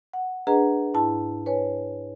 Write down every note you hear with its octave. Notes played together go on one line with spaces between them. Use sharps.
F#5
D4 G#4 B4 D#5 F#5 A#5
G#2 E4 A5
B4 C#5 G#5